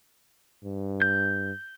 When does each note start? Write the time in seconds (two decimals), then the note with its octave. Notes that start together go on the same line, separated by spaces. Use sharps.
0.64 G2
1.02 G6